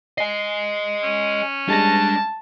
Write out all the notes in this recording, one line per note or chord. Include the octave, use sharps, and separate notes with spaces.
D#5 G#5 C7
C#4
G3 G#3 D4 A5 A#6